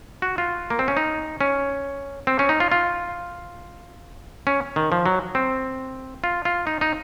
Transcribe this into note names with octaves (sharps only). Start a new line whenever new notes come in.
F#4
F4
A#3
C4
C#4
D#4
C#4
C4
C#4
D#4
F4
F4
C#4
D#3
F3
F#3
C4
F4
F4
D#4
D#4